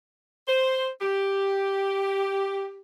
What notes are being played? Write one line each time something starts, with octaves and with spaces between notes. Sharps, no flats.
C5
G4